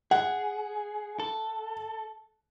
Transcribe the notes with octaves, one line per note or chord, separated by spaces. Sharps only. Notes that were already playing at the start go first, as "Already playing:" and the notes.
G#4 F#5
A4